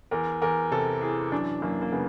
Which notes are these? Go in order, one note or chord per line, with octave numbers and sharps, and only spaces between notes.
E2 A#4
E2 A#4
C3 A4
E3 G#4
F#2 D4
F#2 A#3
A#3
C#3 B3